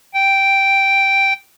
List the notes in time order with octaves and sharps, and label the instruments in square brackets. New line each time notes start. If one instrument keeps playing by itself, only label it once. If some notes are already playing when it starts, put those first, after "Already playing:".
[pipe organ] G5